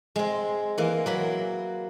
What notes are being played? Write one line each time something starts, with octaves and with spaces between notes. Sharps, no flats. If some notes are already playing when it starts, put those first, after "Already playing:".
G#3 C4
E3 A#3
F#3 A#3 B5